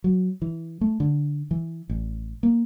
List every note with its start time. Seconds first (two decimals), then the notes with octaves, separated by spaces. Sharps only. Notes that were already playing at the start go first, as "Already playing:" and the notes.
0.04 F#3
0.42 E3
0.81 A3
1.00 D3
1.51 E3
1.89 A1
2.43 A#3